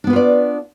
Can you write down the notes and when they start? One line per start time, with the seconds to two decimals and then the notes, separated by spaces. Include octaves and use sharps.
0.04 D4
0.07 B3
0.10 B4
0.13 F4
0.16 D5